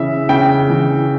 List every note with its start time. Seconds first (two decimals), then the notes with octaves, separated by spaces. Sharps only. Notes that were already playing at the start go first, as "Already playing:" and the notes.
Already playing: C#3 E3 E5
0.29 C#3 G5
0.70 E3